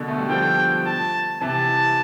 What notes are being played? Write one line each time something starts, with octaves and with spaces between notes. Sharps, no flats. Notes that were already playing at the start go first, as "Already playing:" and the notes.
Already playing: B2 D3
A3
G3
D3 F3 G5
A5
C3 E3 A5